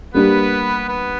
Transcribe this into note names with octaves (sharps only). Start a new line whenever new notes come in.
G3 A#3 B3 D4 G4 B4
B3 B4